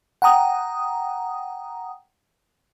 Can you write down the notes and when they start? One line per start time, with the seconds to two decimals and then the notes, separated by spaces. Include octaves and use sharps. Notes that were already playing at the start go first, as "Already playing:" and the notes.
0.22 F#5 G5 A#5 D#6